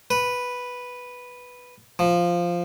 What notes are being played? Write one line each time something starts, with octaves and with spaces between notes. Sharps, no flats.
B4
F3